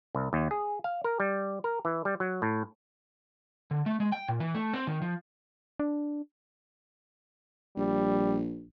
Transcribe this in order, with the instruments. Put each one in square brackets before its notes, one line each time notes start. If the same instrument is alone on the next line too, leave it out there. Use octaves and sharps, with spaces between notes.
[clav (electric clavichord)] C2
D#2
G#4
F5
A#4
G3
A#4
E3
G3
F#3
A2
[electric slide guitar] D3
A3
G#3
G5
A#2
E3
A3
C4
D#3
F3
[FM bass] D4
[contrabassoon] A#1 [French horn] G3